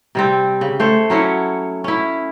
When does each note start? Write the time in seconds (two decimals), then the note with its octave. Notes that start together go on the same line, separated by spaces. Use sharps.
0.15 C3 G3 C4
0.61 C#3
0.80 A3 C5 C#5
1.10 F#3 C#4 E4 C#5
1.84 C#4 E4